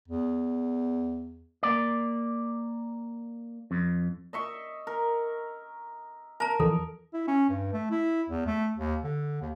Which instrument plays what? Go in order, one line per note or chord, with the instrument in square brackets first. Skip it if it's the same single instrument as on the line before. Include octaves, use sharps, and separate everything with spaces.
[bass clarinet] E2
[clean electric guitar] A#3 D5
F2
[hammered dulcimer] D#5 E5 C#6
A#4
[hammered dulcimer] A#4 [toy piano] A5 A#5
[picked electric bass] E2 E3 F3 [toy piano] A4
[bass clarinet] E4
C#4
G2
A3
E4
E2
A3
D#2
D3
D#2